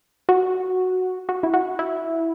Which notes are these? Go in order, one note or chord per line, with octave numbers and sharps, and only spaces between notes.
F#4
F#4
E4
F#4
E4